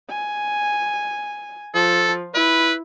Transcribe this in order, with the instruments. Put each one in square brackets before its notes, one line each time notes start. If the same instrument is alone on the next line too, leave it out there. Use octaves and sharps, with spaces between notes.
[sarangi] G#5
[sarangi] F3 [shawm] A4
[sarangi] E4 [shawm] B4